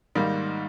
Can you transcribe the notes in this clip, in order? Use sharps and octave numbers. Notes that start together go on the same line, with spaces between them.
G#2 D#3 G3 A#3 D#4